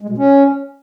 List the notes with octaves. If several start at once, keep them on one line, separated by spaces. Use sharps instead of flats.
G#3
B2
C#4